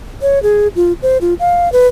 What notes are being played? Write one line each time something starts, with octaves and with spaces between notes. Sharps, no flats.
C#5
G#4
F4
C5
F4
F5
B4